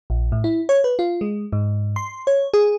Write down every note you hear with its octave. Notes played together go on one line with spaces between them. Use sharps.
A#1
A2
E4
C#5
B4
F4
G#3
G#2
C6
C#5
G#4